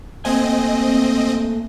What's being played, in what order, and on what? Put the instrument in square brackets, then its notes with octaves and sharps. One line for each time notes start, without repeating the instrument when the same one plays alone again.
[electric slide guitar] A3 A#3 G#5 [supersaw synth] C4 D#5